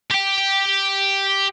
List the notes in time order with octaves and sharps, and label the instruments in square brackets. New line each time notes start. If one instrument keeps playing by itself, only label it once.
[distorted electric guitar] G4 G5